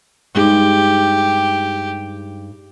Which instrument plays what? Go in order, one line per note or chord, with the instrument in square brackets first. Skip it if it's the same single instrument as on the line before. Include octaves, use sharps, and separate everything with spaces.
[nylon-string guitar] G2 G#3 D#4 [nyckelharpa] G4